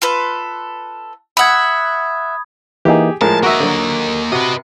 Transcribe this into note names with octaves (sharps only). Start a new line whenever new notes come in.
F4 A4 B4
E5 F#5 B5 D#6 G#6
E3 A#3 D#4 G4 G#4
A2 F3 G#3 A#4 A5
A#3 F#4 D#5 E5
D3 F#3
C3 F#4 B4 D#5